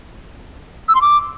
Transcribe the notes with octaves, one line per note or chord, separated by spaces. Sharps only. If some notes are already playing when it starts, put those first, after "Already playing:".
E6
C6
D6